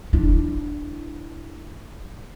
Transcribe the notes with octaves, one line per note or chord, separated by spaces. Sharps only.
D4 E4